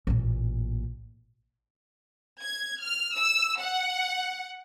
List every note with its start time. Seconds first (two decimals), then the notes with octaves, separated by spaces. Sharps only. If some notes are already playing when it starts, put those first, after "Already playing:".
0.07 A1 A#2
2.42 G#6
2.81 F6
3.16 E6
3.61 F#5